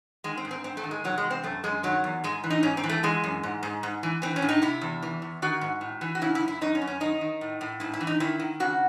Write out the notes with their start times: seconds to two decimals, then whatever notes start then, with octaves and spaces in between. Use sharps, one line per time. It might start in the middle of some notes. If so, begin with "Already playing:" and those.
0.24 D#3 G#3
0.37 C4
0.45 G#2
0.51 C4
0.64 G#2 C4
0.77 A3
0.84 D#3
0.91 G#3
1.04 C3 F#3
1.18 G#3
1.24 E2
1.30 C4
1.43 F#2 A3
1.64 F#2 G#3
1.83 D#3 F#3
2.04 E2
2.24 G#2 G#3
2.44 E3
2.50 D#4
2.63 G#2 C#4
2.77 C4
2.83 E3
2.89 A3
3.03 E3 G#3
3.24 F#2
3.43 G#2
3.63 G#2
3.83 G#2
4.03 E3
4.22 E3 C4
4.36 C#4
4.42 A2
4.49 D#4
4.62 C3 E4
4.81 E2
5.02 E3
5.22 E2
5.42 D#3 F#4
5.61 G#2
5.81 A2
6.01 E3
6.15 F#4
6.21 C#3 E4
6.35 E4
6.41 F#2
6.48 E4
6.61 F#2 D#4
6.75 C#4
6.81 F#2
6.87 C#4
7.00 D#3 D#4
7.21 D#3
7.41 A2
7.61 A2
7.80 G#2 E4
7.94 E4
8.00 E3
8.07 D#4
8.20 D#3 E4
8.39 D#3
8.60 C#3 F#4